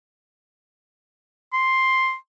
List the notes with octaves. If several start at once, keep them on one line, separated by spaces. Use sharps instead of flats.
C6